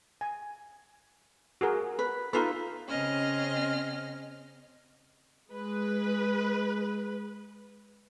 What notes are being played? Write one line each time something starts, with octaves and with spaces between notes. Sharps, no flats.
G#5
F#4 G#4 A#4
B4
D#4 F4 A4 B4
C#3 C4 C#4 D#5 F6
G#3 B4